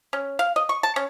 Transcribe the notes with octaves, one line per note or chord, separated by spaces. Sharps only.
C#4
F5
D#5
C#6
A5
C#4